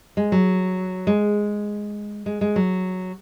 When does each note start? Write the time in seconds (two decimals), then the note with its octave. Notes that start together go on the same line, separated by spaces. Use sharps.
0.17 G#3
0.32 F#3
1.07 G#3
2.26 G#3
2.41 G#3
2.56 F#3